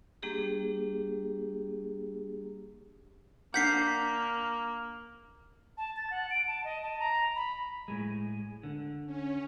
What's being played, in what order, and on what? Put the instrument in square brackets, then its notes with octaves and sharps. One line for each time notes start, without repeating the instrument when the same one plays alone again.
[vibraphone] G3 A#3 D4 G4 G#4
[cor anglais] A#3 [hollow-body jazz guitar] D4 F#5 [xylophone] G6 B6 C7
[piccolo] A5
A6
F#5
D7
A5
D#5
A5
A#5
B5
[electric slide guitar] A2 G#3
D3
[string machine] C#4